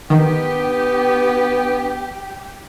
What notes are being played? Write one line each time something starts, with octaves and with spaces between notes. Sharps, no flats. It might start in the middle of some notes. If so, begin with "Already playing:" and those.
D#3 B3 D4 G4